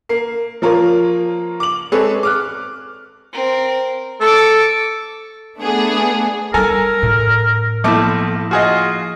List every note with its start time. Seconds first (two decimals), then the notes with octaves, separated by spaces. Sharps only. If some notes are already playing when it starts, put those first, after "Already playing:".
0.09 A#3 C7
0.62 F3 A#3 F4 A#4 C#5
1.60 D6 F#7
1.92 G#3 C4 G#4 A4 B4 C#5
2.23 D6 F6 F#6
3.33 C4 A#4
4.21 A4 C#6 D6
5.58 A3 B3 D4 G#4
6.54 G3 A4 A#4 G#5 A#5
7.03 A2
7.84 B1 F3 A3 A#3 E4 D6
8.51 F4 F#4 G#4 D#5